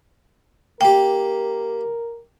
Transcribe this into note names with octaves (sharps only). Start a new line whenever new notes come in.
A#3 G4 A#4 G5